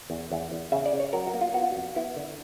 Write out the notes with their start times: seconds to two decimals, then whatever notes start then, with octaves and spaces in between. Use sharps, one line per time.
0.10 E2
0.32 E2
0.52 E2
0.72 C#3 E5
0.86 D5
0.93 C#3
1.00 C#5
1.13 F#3 A#4
1.27 F#4
1.34 A#3
1.41 F4
1.54 B3 F#4
1.63 F4
1.72 F2 F#4
1.96 B3 E4
2.16 D3